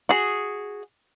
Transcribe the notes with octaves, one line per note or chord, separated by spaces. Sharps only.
F#4 G#4